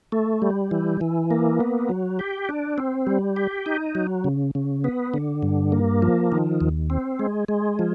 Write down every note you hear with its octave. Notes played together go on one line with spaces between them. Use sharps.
A3
G3
E3
E3
A#3
B3
F#3
G4
D4
C4
G3
G4
D#4
F#3
C#3
C#3
B3
D3
G2
A#3
F3
D#3
D#2
C4
G#3
G#3
F3